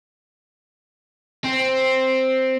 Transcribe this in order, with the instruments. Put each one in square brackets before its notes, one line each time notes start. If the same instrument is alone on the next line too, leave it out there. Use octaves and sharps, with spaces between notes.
[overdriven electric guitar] C4